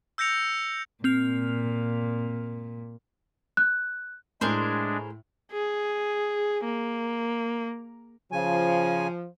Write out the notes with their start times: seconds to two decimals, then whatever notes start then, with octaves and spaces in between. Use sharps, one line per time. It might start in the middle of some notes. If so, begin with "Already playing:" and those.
0.18 E6 G6 A#6 C#7 F7
1.04 A#2 C4 F6 F7
3.57 F#6
4.41 A2 G#3 D4 G#4 A#4 C5
5.52 G#4
6.65 A#3
8.32 C#3 F3 G#5